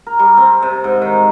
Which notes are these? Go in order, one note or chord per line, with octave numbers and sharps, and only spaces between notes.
A#4
G3
C4
C3
G#2
D#3